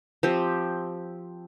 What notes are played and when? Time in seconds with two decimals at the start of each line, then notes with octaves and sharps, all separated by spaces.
0.23 F3 C4 G4